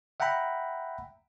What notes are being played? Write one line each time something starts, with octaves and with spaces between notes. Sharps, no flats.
E5 F#5 G5 A#5 B5